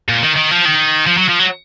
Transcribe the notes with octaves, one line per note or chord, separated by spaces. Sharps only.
A#2
D#3
D#3
F3
D#3
F3
F#3
F3
F#3